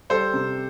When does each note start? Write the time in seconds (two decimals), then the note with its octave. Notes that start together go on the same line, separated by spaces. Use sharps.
0.10 G3 A4 C5
0.34 C3